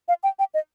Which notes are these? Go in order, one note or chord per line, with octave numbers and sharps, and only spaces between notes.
F5
G5
G5
D#5